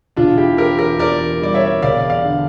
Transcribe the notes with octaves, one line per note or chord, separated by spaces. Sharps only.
E1 D4 F4
E4 G4
E3 G4 A#4
G4 A#4
E2 A#4 D5
G3 D5
C#5 E5
E1 D5 F5
D5 F5
D3